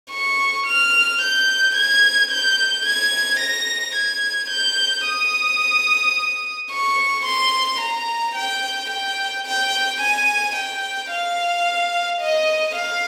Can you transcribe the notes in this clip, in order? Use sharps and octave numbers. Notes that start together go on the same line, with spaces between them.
C#6
F6
G6
G#6
G6
G#6
A#6
G#6
G6
D#6
C#6
C6
A#5
G5
G5
G5
G#5
G5
F5
D#5
F5